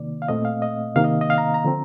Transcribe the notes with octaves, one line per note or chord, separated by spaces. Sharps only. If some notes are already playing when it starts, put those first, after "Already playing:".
Already playing: C3 D#3 A#3 D5
F5
A#2 A3 C4 D#5
F5
D#5
C3 D#3 A#3 F5
D#5
D#5
F5
A#5
A#5
D3 F3 C4